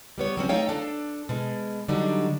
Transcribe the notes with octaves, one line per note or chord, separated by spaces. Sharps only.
G3 B3 C#5
F#3 C4 C#4
A3 D#4 C#5 F5 G5
D4 A4
B2 G#3
D3 F#3 G3 D4 D#4